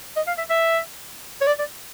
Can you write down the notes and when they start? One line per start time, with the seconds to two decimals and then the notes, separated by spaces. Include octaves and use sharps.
0.16 D#5
0.27 F5
0.38 E5
0.50 E5
1.41 C#5
1.47 D5
1.59 D5